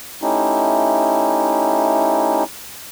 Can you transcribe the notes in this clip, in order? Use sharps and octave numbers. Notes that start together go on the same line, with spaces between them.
A3 C#4 D#4 E4 G4